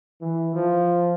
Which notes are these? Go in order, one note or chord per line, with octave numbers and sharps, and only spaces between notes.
E3
F3